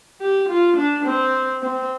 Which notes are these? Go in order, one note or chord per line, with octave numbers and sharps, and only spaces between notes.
G4
F4
D4
C4
C4